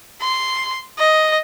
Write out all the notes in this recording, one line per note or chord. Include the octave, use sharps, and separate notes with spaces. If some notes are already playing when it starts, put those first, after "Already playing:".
C6
D#5